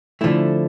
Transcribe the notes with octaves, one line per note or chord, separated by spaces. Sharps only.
D3 F3 A3 E4